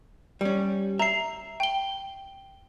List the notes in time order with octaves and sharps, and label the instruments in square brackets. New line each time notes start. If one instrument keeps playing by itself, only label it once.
[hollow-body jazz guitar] G3 C#4
[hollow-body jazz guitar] E5 [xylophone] A#5 C7
[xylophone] G5 G7